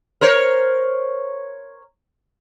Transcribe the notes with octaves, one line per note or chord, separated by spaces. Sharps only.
A#4 C5 C#5